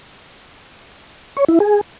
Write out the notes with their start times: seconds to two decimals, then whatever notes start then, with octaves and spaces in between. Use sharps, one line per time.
1.37 C#5
1.49 E4
1.60 G#4